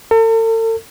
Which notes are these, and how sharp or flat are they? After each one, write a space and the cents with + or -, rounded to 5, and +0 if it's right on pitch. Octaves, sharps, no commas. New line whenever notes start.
A4 +40